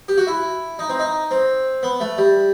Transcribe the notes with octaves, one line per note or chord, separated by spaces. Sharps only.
G4
F#4
E4
D#4
C4
D#4
C4
B3
A3
G3